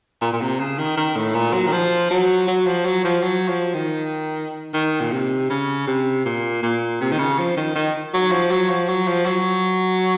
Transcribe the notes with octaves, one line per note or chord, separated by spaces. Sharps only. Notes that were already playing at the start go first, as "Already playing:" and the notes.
A#2
A#2
C3
C#3
D#3
D#3
A2
A#2
F#3
D#3
F3
F#3
F#3
F3
F#3
F3
F#3
F3
D#3
D#3
A#2
C3
C#3
C3
A#2
A#2
C3
D#3
C#3
F3
D#3
D#3
F#3
F3
F#3
F3
F#3
F3
F#3